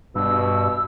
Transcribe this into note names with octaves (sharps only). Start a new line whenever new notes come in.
G2 B2 E6